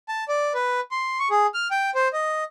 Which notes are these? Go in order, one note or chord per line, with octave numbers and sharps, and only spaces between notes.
A5
D5
B4
C6
C#6
G#4
F6
G5
C5
D#5